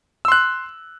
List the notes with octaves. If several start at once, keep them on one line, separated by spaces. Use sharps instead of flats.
C6 E6 F#6